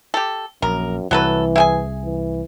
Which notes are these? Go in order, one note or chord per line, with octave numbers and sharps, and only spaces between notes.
G4 A4
A#1 F#2 A#4
C2 E3 F#3 A4 B4
E4 G#4 G#5
E3